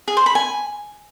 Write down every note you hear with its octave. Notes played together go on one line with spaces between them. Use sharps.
G#4
C5
B5
G#5